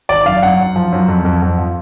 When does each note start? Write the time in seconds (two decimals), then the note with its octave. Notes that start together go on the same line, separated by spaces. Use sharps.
0.09 G#1 D5
0.25 F#2 F5
0.43 F#2 F#5
0.59 F#2
0.76 F3
0.93 F#2
1.08 F2
1.25 F2
1.42 F2
1.59 F3